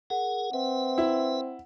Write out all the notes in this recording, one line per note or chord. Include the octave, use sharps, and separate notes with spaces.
G#4 A#4 F#5
C4 B4 E5
E4